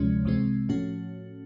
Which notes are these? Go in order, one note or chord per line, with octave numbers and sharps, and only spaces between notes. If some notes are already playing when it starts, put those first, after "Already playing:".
Already playing: D2 C3 F3 G#3 C#4
C2 C3 E3 G#3 C4
A2 F3 A3 C#4 F#4